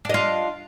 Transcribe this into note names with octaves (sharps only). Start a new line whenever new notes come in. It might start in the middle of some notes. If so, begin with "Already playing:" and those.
D4 F4 D#5